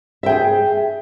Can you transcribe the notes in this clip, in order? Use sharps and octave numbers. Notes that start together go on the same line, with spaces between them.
G#4 E5 G5